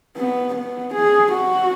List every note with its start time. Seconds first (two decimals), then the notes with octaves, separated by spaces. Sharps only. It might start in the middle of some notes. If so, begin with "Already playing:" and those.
0.17 B3
0.55 B3
0.95 G#4
1.33 F#4